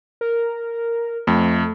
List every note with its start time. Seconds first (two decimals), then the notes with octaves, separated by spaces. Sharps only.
0.21 A#4
1.27 F2 A3